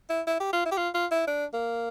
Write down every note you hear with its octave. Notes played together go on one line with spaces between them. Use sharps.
E4
E4
G4
F4
E4
G4
F4
F4
E4
D4
A#3